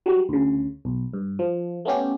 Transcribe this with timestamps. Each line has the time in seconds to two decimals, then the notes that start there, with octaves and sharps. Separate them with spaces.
0.06 F#3 G3
0.29 D2 C#3
0.85 B1
1.13 G2
1.39 F3
1.85 A3 B3 C#4 G4